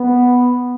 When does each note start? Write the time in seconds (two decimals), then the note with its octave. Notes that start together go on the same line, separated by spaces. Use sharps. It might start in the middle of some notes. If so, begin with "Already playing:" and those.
Already playing: B3